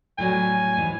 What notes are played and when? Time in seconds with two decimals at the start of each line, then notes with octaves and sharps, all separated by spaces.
0.18 A2 F#3 G3 G#5
0.77 G#2 E3